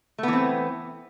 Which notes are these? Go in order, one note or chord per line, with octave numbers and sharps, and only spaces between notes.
E3 A3 B3 C4